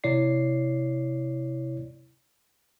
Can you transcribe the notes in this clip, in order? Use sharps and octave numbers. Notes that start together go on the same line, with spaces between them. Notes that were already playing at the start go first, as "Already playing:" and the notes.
C3 E4 C#5 D5 C7